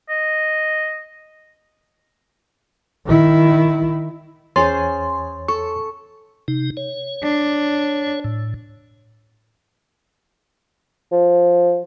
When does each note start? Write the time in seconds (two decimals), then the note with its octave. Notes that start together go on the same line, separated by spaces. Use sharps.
0.09 D#5
3.06 D#3 E4
4.56 E2 C#4 G#4 C5 C#5 C6 A6
5.48 A4 C#6
6.48 C3 D#4
6.77 C#5
7.23 D4
8.24 A2
11.12 F3